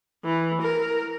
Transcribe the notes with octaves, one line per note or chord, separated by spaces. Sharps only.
E3
A#4